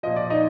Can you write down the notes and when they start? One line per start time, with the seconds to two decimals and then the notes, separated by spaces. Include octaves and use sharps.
0.03 A#2 F3 D#5
0.16 D5
0.30 D#4 D#5